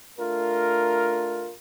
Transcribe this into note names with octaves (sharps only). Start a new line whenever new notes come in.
A3 D4 F4 A#4